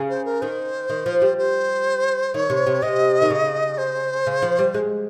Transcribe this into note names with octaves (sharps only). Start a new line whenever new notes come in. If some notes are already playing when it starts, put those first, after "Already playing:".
Already playing: C#3
C5
A#4
D#3 C5
D#3
F3
G3
C5
D#3 C#5
C3
C3
C3 D#5
D#3
C#3
C5
C#3
F3
G3
G#3